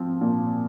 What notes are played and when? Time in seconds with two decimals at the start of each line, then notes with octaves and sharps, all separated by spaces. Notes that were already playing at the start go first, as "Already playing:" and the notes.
Already playing: F3 C4
0.21 A#2